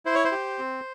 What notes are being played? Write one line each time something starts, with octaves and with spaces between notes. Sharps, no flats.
E4 C5
C#5
C5
G4
C4